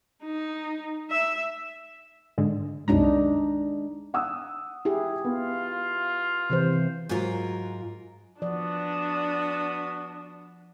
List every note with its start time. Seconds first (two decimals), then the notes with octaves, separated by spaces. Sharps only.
0.24 D#4
1.11 E5
2.38 G#2 D3 G#3
2.88 C2 F#2 G#3 D4 D#4 A#5
4.14 F#5 D#6 E6
4.85 E4 G4 G#4
5.24 B3 F4
6.50 C3 E3 C5
7.09 G#2 F#3 F4 A#4
8.42 F3 B3 D4 F#4 D5 D#6